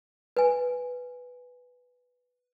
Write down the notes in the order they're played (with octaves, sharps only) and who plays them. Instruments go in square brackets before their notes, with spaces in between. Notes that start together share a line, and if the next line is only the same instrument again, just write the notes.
[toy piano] B4 G#5